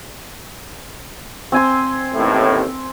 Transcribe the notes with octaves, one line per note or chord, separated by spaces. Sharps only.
C4 G#5 C6
A1 D#2 A2